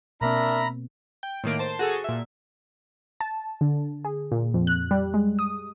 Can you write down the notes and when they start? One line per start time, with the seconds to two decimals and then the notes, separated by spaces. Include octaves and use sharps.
0.21 B2 A#3 C4 D4 A#4 E5 A#5 B5
1.23 G5
1.44 A2 D#3 A#3 D7
1.59 C5 A5
1.79 F#4 G#4 A4
2.04 A#2 E5
3.20 A5
3.61 D3
4.05 G#4
4.32 A#2
4.54 F2
4.67 F#6
4.91 G3
5.14 G#3
5.39 D#6